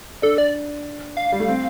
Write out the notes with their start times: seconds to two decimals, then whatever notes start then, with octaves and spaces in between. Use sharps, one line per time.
0.22 D4 A4
0.38 D5
1.17 F5
1.32 G3
1.40 A3
1.48 C4